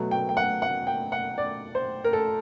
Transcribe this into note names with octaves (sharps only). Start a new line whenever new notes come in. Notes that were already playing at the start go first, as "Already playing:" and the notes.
Already playing: B2 F#3 A3
G5
G5
F#5
F#5
G5
F#5
D5
C5
A#4
A4